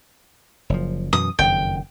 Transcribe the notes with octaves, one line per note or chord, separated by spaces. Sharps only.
F#1 F3
F#2 B2 E3 D#6
F#1 F2 D#3 G5